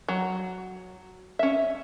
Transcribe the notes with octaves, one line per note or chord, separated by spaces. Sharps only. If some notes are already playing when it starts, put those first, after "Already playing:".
F#3
C#4 E5